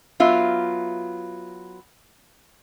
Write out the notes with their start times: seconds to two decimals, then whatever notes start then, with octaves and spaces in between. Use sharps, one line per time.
0.20 F#3 B3 F4 E5 F5